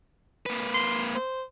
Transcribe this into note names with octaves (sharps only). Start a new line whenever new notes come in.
A#3 B4
C6
C5